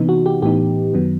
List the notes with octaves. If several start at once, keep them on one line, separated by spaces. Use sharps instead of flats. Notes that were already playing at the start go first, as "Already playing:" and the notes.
Already playing: C3 E3 B3 D#4
F#4
G4
A2 E3 B3 D#4 G4
F#2 D#3 F#3 B3